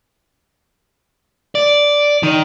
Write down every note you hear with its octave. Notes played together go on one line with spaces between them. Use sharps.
D5
D#3